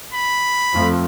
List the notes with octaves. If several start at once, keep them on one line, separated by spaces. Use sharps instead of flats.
B5
F2 F3 A3